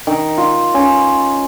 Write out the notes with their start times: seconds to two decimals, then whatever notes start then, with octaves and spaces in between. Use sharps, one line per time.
0.07 D#3
0.37 F4
0.74 C#4